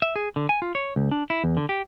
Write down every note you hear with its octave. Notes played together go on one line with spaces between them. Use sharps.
E5
G#4
D3
G#5
F4
C#5
C#2
D4
E4
E2
D3
G4